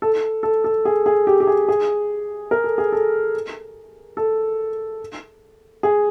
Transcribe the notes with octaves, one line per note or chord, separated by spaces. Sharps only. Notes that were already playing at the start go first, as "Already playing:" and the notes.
A4
A4
A4
G#4
G#4
G4
G4
G#4
G#4
A#4
A4
G#4
A4
A4
G#4